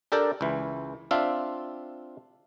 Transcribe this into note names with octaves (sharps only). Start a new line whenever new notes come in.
D4 G4 A4 A#4 D5 G5
C#2 E3
C4 D4 F4 E5 F5